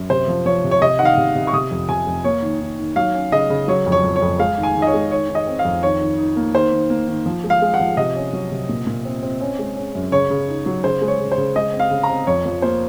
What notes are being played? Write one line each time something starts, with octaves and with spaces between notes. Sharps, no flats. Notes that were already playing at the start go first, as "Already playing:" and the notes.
Already playing: F#2
C3 C5
F3
F3 C#5
C3
C#5
C3 D#5
D#3 F#5
F5
C3
C3
C#6
C3 D#6
F2
C3 G#5
F2
A#3 C#5
D#3
D#3
D#3
F#3 F5
C#4
C#3 D#5
C#3
F#3 C#5
F2
C#5
F2
C#5
F2
G#3 F5
D#3
G#5
D#3
D#5
C#5
G#3
D#3 C#5
D#3
D#5
C4
F5
F2
D#3 C#5
D#3
D#4
A#3
D#3 C5
D#3
A#3
D#3
F3
G#3
F5
G#3
F#5
F3
C3 D#5
C#4
F#3
C3
A#2
A#2
C4
C4
C#4
G#3
C#4
F#2
C#3 C#5
C#3
D#4
F#3
C#3 C5
G#3
C#5
C#3
C5
C#3
G#3 D#5
C4
F5
C#3
A#5
C4
F2 C#5
F3
A#3 C5